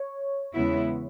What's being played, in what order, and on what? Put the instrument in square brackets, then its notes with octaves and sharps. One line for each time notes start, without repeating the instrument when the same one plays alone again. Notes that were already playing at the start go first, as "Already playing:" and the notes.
Already playing: [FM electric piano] C#5
[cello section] E2 C#3 G#3 B3 E4